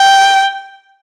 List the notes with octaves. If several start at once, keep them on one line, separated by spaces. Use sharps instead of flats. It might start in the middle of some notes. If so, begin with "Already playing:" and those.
Already playing: G5